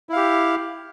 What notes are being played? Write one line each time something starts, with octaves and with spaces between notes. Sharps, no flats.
E4 G4 F5